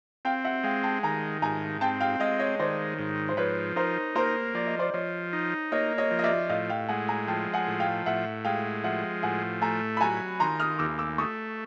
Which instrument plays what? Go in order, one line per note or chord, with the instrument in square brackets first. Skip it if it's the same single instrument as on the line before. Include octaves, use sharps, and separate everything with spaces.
[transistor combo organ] C4 [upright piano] F5 G5
[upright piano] E5 F#5
[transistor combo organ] G#3 [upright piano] F5 G5
[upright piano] G5 A5
[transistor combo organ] D#3 [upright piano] G#5 A#5
[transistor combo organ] G#2 [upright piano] G#5 A#5
[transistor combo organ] C4 [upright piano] G5 A5
[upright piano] F5 G5
[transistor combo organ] G#3 [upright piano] D#5 F5
[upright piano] C#5 D#5
[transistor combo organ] D#3 [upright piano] C5 D5
[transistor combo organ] G#2
[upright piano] C5
[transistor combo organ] F3 [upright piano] B4 C#5
[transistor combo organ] D#4 [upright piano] A#4 C5
[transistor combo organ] A#3 [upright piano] A#4 C5
[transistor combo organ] F3 [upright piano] D5
[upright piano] D#5
C5 D5
[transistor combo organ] F3 [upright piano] C#5 D#5
[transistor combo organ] D#4
[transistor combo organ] A#3 [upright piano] C#5 D#5
[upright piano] C#5 D#5
[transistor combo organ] F3
[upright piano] D#5
D5 E5
[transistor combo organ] A2 [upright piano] D#5 F5
[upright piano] F5 G5
[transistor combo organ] G#3 [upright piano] F#5 G#5
[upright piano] G#5 A#5
[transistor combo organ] F3 [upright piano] G5 A5
[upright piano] F#5 G#5
[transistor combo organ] A2
[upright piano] F5 G5
[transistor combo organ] A2 [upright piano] E5 F#5
[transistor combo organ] G#3 [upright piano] F5 G5
[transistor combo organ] F3 [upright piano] E5 F#5
[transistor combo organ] A2 [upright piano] F#5 G#5
[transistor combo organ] A3 [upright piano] G#5 A#5
[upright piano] B5
[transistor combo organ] F#3 [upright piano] G#5 A#5
[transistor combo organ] D#3 [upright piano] A#5 C6
[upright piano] D#6 F6
[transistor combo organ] D#2 [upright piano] D6 E6
[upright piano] D6 E6
[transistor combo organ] A3 [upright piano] C#6 D#6